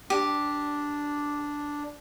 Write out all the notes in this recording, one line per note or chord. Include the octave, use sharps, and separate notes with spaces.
D4 G4